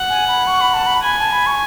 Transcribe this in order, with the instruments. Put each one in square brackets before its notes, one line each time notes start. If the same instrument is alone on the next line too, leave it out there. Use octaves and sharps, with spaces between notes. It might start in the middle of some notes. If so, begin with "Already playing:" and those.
Already playing: [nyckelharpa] F#5
[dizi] G#5
B5
C#6
B5
A5
B5
[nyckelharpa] G#5 [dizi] B5
[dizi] A5
B5
C#6